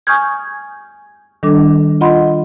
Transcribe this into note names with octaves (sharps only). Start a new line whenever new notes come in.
G#5 C#6 D#6 F6 G6 G#6
D#3 G3 D4 A4 D6
F4 D#5 F#5 B5 C6